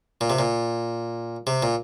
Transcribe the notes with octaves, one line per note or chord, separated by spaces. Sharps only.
A#2
C3
A#2
C3
A#2